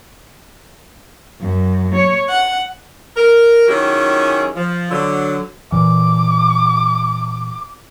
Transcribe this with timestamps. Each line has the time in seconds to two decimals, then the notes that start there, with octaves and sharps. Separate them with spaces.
1.41 F#2
1.94 C#5
2.29 F#5
3.17 A#4
3.68 D#3 F#3 C#4 E4 G4 G#4
4.55 F3
4.91 D3 F#3
5.72 A#2 E3 D6